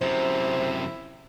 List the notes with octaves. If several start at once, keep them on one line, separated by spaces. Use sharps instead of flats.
F#2 C3 E4 C5